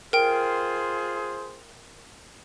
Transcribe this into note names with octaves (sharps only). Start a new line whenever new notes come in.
F4 G#4 A#4 C5 G5